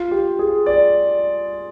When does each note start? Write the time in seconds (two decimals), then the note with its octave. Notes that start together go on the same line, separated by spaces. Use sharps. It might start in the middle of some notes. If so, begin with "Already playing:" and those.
Already playing: F4
0.11 G4
0.39 G#4
0.66 D5